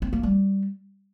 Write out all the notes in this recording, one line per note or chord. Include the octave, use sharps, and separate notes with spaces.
C4
A#3
G3